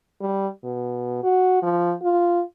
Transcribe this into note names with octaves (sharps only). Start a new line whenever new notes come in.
G3
B2
F#4
F3
F4